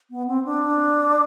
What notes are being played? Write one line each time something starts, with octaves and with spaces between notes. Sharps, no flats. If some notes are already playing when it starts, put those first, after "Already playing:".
B3
C4
D4